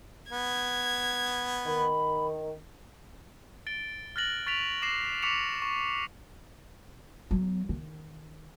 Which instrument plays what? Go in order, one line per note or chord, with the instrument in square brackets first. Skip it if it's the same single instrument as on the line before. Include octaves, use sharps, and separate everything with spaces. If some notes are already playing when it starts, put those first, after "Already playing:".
[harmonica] B3 [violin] G#6
[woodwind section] D#3 [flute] B5
[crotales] A6 D7 G7
F6 F#6 A6 A#6 F#7
C#6 A6 B6 D7 F7
D6 A#6 C7 E7
C#6 D6 B6 C#7 E7 F7
C#6
[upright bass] F#3 B3
D#3